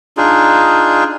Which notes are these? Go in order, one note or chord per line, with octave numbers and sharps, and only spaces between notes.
D4 D#4 F4 G#4